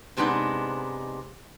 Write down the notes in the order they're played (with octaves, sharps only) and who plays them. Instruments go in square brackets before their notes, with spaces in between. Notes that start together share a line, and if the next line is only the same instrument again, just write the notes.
[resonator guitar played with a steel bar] G#2 C3 G#3 B3 D4 D#4